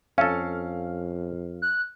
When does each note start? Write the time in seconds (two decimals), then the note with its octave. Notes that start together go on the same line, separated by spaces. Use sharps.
0.18 F2 C#4 A4 F5
1.62 F#6